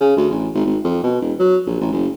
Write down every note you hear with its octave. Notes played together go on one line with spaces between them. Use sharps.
C#3
D2
A1
G#1
G#1
F2
B2
E1
F#3
A#1
A1
F#1